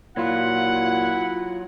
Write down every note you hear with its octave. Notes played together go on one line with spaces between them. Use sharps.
A#2 F#3 E4 F4 F#5